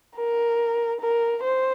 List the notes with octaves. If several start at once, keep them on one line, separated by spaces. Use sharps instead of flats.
A#4
A#4
C5